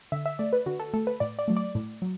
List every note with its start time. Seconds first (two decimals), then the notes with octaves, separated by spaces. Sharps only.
0.12 D3 E5
0.26 E5
0.39 A3 D5
0.53 B4
0.66 D3 F#4
0.80 A4
0.94 A3 A4
1.07 B4
1.20 A2 D5
1.39 D5
1.48 F#3 A3
1.57 D5
1.75 A2
2.02 F#3